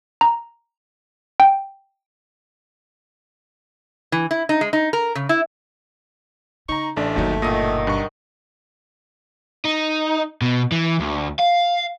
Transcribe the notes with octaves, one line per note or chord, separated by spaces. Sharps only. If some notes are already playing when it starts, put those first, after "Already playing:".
A#5
G5
E3
E4
D#4
G#3
D#4
A#4
C#3
E4
C#3 D#4 A#5 C#6
A1 A3 D4 D5
G1 D#2 B2 F#3 D#4
A#2 D#3 F#3 D#5
G2 C#6
D#4
B2
E3
D2
F5